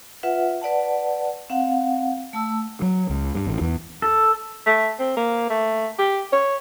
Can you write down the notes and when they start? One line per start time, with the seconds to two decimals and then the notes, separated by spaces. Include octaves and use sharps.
0.23 F4 B4 E5 F#5
0.62 B4 D5 F#5 A5
1.50 C4 F5 F#5
2.33 A3 A5 E6
2.82 F#3
3.10 C#2
3.35 G2
3.47 A1
3.61 E2
4.02 A4
4.66 A3
4.99 C4
5.17 A#3
5.50 A3
5.98 G4
6.33 C#5